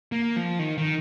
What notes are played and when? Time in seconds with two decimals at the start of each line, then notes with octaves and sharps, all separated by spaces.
0.12 A#3
0.36 F3
0.59 D#3
0.78 D#3